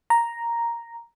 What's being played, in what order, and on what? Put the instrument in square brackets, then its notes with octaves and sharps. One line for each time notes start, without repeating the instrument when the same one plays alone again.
[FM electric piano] A#5